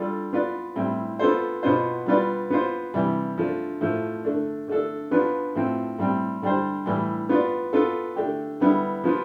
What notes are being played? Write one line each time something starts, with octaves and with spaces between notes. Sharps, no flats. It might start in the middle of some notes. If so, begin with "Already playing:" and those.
Already playing: G3 D4 F4 A4 D5
B3 F4 B4 D5
A2 G3 C4 E4
B3 F4 A4 C5
B2 B3 F4 C5
G3 B3 F4 B4 D5
B3 F4 C5
C3 E3 G3
F3 A3 D4
A2 F3 A3
D3 A3 D4
D3 A3 D4 A4
F3 B3 D4 F4 B4
A2 F3 C4
A2 G3 C4
D3 G3 D4 G4 C5
A2 E3 G3
B3 F4 B4 D5
B3 F4 A4
D3 A3 D4 G4
D3 G3 B3 E4
F3 B3 F4